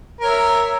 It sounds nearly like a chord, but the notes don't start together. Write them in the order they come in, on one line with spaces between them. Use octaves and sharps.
A#4 C#5 E5